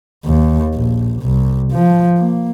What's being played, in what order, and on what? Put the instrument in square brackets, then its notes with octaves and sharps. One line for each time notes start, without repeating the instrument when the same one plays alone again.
[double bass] D#2
A#1
C2
F3
A#3